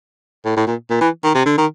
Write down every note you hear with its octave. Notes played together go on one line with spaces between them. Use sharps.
A2
A2
A#2
A#2
E3
D#3
C3
D3
D#3